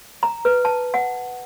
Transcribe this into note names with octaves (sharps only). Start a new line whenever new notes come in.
A#5
B4
A5
F#5